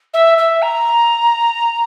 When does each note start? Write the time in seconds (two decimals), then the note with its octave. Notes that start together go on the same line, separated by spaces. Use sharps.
0.13 E5
0.38 E5
0.62 A#5